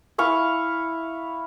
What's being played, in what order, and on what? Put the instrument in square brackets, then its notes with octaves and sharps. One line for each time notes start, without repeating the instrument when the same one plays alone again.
[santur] E4 F5 C#6